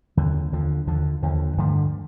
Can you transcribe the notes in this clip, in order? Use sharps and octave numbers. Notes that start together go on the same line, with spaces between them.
D#2 D3 F3
D#2 D3 F3
D#2 D3 F3
D#2 D3 F3
G2 D3 F3 A3